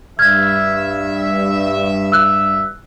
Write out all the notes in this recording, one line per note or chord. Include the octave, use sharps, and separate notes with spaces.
G2 E5 F6 G#6
E6 F#6